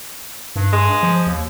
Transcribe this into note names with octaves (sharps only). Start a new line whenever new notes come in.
G2
G#3
F3
D#2